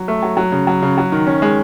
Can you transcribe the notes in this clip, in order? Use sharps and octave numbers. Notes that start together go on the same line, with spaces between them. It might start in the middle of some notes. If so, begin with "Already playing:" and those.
Already playing: F#3
A3
F#3
F#3
C#3
F#3
C#3
F#3
D#3
C#4
G#3